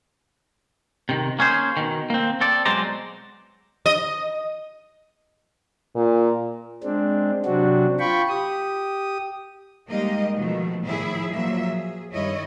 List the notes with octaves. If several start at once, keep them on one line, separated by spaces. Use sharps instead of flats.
C3 D#3
A#3 C#4 G#4 C5
B2 D#3
A#3 C4
C4 A4 D5
B2 F#3 G#3 C5 D5 A#5
D#5
A#2
G#3 C4 D4
C3 F#3 C4 D4 F#4
F4 G5 B5 C#6
G4 D#6
G3 G#3 A#3 D#4 G4 D#5
B2 D#3 F3 A3
A2 D#3 F3 E4 G#4 E5
A#2 F3 F#3 A#3 E5
G#4
G2 D#3 E4 C#5 D#5